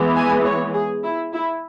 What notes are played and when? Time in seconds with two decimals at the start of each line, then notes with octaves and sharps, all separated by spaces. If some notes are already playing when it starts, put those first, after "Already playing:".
Already playing: E3 G#3 B3
0.16 G#5
0.44 C#5
0.74 G#4
1.04 E4
1.33 E4